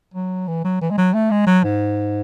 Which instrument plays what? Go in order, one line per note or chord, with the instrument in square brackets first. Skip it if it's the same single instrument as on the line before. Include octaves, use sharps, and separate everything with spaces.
[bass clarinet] F#3
E3
F#3
E3
G#3
F#3
A3
G#3
F#3
G#2